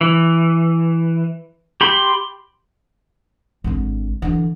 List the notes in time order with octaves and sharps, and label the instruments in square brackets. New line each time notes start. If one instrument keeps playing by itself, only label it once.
[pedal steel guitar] E3
G4 B5 C6
[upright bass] G#1 D3
D3 E3